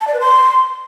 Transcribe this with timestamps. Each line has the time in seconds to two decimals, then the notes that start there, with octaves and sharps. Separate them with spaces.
0.01 A5
0.07 D5
0.14 B4
0.20 C6